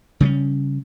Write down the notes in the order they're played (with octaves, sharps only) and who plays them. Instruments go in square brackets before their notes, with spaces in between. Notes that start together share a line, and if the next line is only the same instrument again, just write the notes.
[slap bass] C#3 G3 A#3 C#4